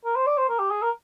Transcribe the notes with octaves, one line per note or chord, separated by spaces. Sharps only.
A#4
C5
D5
C5
A#4
G4
G#4
A#4